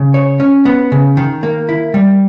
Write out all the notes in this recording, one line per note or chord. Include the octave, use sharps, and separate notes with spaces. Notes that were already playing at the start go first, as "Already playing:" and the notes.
Already playing: C#3
C#5
C#4
B3
C#3
D#3
A#3
E4
G3